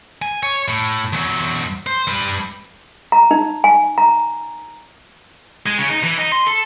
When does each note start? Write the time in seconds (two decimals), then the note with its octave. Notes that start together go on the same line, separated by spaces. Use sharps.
0.22 G#5
0.43 C#5
0.68 A2
1.13 E2 F#3
1.87 C5
2.08 G3 B4
3.12 A#5
3.31 D#4
3.64 G#5
3.98 A#5
5.66 G#3
5.78 C#3
5.90 D#4
6.04 E3
6.18 D#4
6.32 C6
6.46 A4